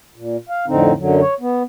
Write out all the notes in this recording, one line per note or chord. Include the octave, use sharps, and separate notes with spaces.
A#2
F5
F2 A2 D3 C4 D#4
F#2 D3 F#3
C#5
B3